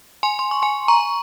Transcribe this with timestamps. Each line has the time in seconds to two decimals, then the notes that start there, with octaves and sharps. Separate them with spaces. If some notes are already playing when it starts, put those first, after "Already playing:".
0.23 G#5 C6
0.39 C6
0.51 C#6
0.62 G#5 C6
0.88 A#5 C#6